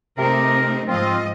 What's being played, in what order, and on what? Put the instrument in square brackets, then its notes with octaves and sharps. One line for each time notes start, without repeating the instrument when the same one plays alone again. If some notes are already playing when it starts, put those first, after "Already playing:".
[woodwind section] C3 A#4 [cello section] A3 C4 D#4
[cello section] G#2 F3 D#5 [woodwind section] C4 F4